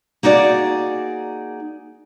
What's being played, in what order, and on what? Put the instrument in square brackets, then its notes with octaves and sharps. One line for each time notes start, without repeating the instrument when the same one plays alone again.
[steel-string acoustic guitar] A#3 D#4 F#4 G#4 D5